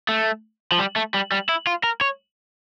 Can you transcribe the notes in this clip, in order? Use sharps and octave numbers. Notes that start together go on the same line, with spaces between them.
A3
F3
G3
A3
G3
G3
E4
F4
A#4
C#5